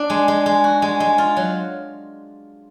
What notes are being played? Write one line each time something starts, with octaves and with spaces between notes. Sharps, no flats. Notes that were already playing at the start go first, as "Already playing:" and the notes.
Already playing: D4
G#3
G#3
G#3
F#4
G#3
G#3
F4
F#3